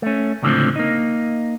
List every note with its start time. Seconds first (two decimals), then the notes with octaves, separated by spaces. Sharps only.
0.02 A3 C#4
0.42 C#2 A2 D3 E3 F3 C4
0.76 A#3 D#4